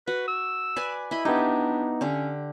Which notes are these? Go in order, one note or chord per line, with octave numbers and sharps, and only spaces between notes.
F#4 B4
E6
B4 D5 G#5
E4 D#5 B5
B3 D4 D#4 G4
D3 C#4 G4